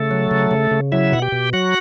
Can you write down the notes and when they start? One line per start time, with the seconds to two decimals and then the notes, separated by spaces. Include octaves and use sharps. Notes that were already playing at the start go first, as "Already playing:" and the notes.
Already playing: C#3 A3 A4
0.11 F#3
0.31 C#3
0.51 C#3
0.71 C#3
0.92 F#3 E4 E5
1.12 B2 F#5
1.22 G4 G5
1.32 B2
1.53 F#3 F#4 F#5